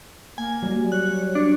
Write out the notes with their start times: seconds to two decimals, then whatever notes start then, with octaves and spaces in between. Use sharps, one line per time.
0.38 A#3 G#5
0.63 F#3 G3
0.92 C#5 F#6
1.35 D4 C#5